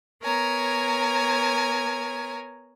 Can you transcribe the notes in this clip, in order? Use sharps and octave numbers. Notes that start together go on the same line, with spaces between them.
B3 A#4 C#5 G#5 A#5